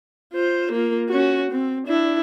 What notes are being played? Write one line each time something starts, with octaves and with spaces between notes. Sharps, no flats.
F4 C5
A#3 F4
C#4 F#4
C4
D4 E4